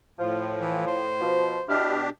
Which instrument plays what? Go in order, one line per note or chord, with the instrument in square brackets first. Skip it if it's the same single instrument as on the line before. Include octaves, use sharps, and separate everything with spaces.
[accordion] A2 [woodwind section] F3 [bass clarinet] F4
[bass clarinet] E3
C5
[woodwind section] B2 F3
[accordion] B2 D4 G4 [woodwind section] E4 D#5 F6